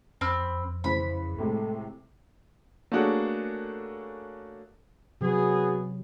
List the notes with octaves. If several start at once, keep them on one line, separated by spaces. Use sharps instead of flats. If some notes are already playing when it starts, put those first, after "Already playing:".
F2 C4 B5 F6
C#3 E3 C5 B5
A2 C3 G#3 A3
A3 A#3 C#4 D4 F#4 G#4
C3 F#3 B3 F#4 G#4